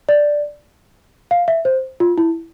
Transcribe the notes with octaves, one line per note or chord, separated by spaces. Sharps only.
D5
F5
E5
C5
F4
E4